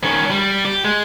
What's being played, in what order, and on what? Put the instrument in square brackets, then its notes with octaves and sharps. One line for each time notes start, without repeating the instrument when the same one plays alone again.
[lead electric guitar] D#3 C#4
G3
G4
G#3